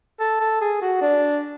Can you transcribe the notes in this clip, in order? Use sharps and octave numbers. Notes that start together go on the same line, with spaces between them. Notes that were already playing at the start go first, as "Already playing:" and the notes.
A4
A4
G#4
F#4
D4